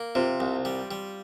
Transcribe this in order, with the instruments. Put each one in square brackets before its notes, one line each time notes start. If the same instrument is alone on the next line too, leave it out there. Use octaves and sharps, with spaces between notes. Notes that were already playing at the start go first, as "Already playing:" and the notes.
Already playing: [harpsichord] A#3
[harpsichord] C3 [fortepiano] C4 F4
[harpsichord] C2
G3
G3